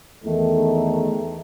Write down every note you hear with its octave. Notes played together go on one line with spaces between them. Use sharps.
E2 D#3 A3